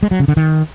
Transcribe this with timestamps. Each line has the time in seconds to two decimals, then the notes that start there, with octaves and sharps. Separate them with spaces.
0.03 G#3
0.11 F#3
0.20 C#3
0.28 D3
0.37 D#3